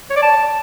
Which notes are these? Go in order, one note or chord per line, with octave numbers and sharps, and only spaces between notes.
C#5
D5
A5